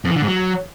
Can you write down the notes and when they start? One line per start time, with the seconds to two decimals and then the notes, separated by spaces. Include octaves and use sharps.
0.05 F2
0.10 E3
0.16 D3
0.22 G#2
0.27 F#3